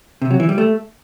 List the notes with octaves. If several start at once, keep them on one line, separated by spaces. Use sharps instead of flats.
C3
F#3
E3
G3
A3